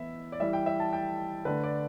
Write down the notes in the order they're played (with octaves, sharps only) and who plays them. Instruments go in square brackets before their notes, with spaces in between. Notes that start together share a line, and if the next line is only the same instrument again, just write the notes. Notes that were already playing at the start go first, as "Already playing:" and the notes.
Already playing: [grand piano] E3 B3 E4 [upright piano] E5
[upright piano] D5
[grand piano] E3 G3 E4 [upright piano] E5
[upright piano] G5
E5
A5
G5
[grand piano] D3 A3 D4 [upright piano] B4
[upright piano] D5